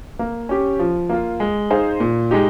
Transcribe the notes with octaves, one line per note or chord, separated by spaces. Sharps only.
A#3
C#4 G4
F3
A#3 F4
G#3
D#4 G#4 C5 F5
A#2
G#3 D#4 G4